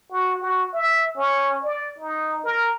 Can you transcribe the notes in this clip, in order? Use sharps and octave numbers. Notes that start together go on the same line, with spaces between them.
F#4
F#4
E5
C#4
D5
D#4
A#4